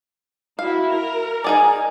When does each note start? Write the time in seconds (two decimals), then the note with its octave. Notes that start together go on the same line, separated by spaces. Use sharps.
0.59 E4 F#4 F5
0.91 A#4
1.44 D#4 G#4 D5 G#5